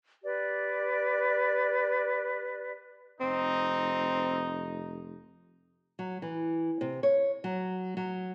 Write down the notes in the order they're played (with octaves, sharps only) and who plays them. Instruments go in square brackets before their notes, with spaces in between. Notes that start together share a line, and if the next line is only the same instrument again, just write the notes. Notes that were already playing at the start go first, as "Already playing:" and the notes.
[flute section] G4 B4 D5
[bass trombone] F1 [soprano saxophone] C4 [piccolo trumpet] D#4
[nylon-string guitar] F#3
E3
C3
C#5
F#3
F#3